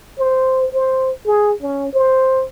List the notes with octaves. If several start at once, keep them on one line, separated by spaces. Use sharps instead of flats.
C5
C5
G#4
C#4
C5